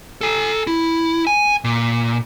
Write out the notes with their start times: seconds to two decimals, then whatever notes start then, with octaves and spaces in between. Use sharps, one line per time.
0.21 A4 G#5
0.67 E4
1.27 G#5
1.64 A#2